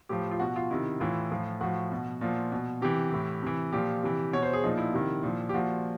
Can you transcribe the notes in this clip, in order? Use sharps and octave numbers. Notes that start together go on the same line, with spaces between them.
A2 F3 G4
F4
B2 F#4
F4
C3 D#3 E4
A2 E3 F4
A2 F3
A2 F3 F#4
B2
A#2 F3
B2
C3 E3 G4
A2 E3
C3 E3
A#2 F3 G4
C3 E3
B2 C#5
C5
G#4
A#2 F3 D#4
E4
C3 D#3
A#2 F3
G4
A#2 F3 F#4